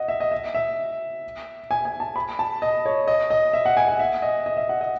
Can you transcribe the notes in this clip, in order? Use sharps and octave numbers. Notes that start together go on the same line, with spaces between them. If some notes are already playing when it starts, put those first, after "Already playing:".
Already playing: D#5 F#5
E5
D#5
E5
E5
G#5
G#5
A5
B5
A5
D#5
C#5
D#5
D#5
E5
F#5
G#5
F#5
E5
D#5
D#5
E5
F#5
D#5